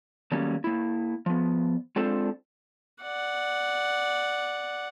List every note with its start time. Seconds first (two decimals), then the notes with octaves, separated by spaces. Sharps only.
0.32 D#3 F#3 G3 A3 A#3 C#4
0.64 A#3 E4
1.26 F3 B3
1.96 G#3 C4 D4 F4 A4 C5
3.02 D5 F#5